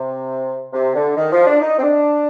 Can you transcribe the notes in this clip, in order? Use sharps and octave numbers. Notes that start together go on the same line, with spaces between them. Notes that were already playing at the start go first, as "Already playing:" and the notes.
Already playing: C3
C3
D3
D#3
F3
D4
D#4
C4
D4